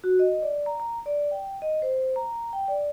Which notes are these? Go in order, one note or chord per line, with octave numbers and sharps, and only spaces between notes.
F#4
D#5
D5
A#5
A#5
D5
G5
D#5
C5
A#5
G5
D5